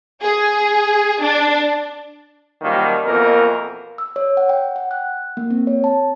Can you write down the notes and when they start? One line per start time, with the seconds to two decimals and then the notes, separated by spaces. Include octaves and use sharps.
0.21 G#4
1.21 D4
2.62 F#2 D#3 F3 G3 A#3
3.06 F2 B2 E3 A#3 A#4
3.98 E6
4.16 C#5
4.37 F#5
4.49 G5
4.76 F#5
4.91 F#6
5.37 A#3
5.50 C4
5.67 C#5
5.84 A5